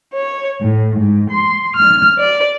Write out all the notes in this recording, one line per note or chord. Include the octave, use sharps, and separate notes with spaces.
C#5
A2
G#2
C6
F6
D5